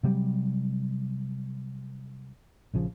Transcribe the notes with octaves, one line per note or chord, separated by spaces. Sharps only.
C3 F#3 G3
A#1 C#3 F3